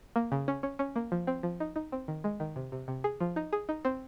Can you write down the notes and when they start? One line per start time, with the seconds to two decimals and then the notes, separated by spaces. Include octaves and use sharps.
0.16 A#3
0.32 C#3
0.48 C#4
0.63 C#4
0.79 C#4
0.96 A#3
1.12 F3
1.27 C4
1.43 F3
1.60 D#4
1.76 D#4
1.92 C4
2.08 D#3
2.24 G#3
2.40 D#3
2.56 C3
2.72 C3
2.88 C3
3.04 G#4
3.20 F3
3.36 D#4
3.53 G#4
3.69 D#4
3.85 C4